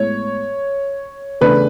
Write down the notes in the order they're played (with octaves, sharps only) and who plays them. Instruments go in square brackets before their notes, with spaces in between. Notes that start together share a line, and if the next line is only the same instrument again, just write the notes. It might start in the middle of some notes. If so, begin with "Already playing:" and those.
Already playing: [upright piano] A2 G#3 B3 [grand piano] C#5
[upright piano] E2 C#3 E3 A3 D4 [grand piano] B4